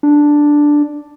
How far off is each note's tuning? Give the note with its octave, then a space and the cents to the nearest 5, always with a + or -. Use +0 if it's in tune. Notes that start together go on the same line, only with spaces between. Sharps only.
D4 +0